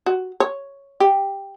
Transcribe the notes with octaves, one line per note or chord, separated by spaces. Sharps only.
F#4
C#5
G4